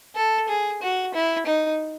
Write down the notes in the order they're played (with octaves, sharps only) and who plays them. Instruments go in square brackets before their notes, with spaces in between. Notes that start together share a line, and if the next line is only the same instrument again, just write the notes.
[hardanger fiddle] A4
G#4
F#4
E4
D#4